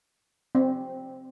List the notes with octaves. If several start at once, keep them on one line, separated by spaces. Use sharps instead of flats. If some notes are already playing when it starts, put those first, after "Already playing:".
C4